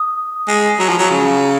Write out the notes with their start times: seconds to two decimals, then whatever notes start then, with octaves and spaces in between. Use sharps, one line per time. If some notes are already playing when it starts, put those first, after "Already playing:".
Already playing: D#6
0.48 G#3
0.79 F#3
0.89 F3
0.98 F#3
1.10 C#3